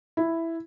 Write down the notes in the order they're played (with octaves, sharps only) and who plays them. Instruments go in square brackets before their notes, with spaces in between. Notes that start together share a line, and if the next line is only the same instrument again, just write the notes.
[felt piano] E4